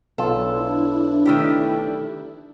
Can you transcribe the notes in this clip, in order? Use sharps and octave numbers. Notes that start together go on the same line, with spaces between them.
B1 D4 E4 F4 A4
D#3 A3 G4